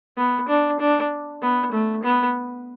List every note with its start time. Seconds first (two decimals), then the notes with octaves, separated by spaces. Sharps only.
0.17 B3
0.48 D4
0.80 D4
1.42 B3
1.72 A3
2.03 B3